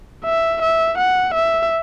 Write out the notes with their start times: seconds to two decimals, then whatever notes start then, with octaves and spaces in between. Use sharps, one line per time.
0.25 E5
0.62 E5
0.98 F#5
1.34 E5